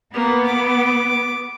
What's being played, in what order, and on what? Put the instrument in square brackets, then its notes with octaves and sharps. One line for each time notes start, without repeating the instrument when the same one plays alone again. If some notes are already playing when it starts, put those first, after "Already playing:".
[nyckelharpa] A#3 [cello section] B3
[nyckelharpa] D6